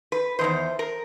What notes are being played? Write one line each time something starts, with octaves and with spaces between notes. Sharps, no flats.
B4
C3 D#3 C5
E2
A#4